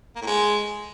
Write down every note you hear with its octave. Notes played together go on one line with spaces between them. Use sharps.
A#3
A2
G#3